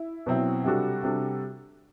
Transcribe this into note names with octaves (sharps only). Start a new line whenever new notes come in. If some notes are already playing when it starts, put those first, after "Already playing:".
Already playing: E4
B2 F#3 C4 E4
C3 G3 D4 F#4 A4
C3 G3 D4 F#4 A4